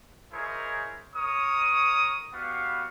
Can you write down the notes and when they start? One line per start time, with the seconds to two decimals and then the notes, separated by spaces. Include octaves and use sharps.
0.32 D#4 E4 G#4 A#4 C5 C#5
1.15 A#4 C#5 C#6 D#6
2.32 G3 B3 F#4 F5